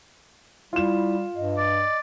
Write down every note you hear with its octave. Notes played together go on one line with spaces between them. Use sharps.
G3 E4 F4 E7
G2 D#5
D5